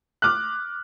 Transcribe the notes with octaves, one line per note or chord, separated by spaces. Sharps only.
D6 F6 F#6